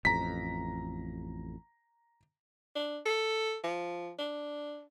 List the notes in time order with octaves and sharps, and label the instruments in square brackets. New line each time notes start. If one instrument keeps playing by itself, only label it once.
[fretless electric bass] A1 F2 [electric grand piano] A#5 B6
[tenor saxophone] D4
A4
F3
D4